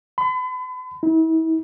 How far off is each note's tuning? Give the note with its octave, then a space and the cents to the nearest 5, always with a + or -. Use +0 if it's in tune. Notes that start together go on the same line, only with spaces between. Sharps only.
B5 +40
E4 -40